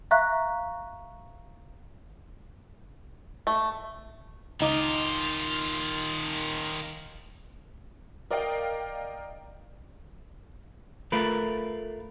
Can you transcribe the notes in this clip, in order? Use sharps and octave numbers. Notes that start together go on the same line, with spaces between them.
E5 F5 A#5 C#6 F#6
A3
C#2 D#3 D#4 F4 D6
A#4 D5 D#5 F5 G5
A3 F4 A#4 B4